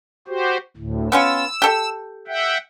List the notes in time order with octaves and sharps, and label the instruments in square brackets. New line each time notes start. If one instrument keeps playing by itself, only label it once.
[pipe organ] F#4 G4 C5
D2 A2
[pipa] B3 C#4 F4 [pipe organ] E6
[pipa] G4 A4
[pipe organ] E5 F#5 G5